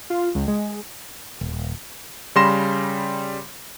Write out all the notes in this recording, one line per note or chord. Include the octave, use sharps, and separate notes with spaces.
F4
C#2
G#3
D#1
C#3 G3 B5 C6 A#6 E7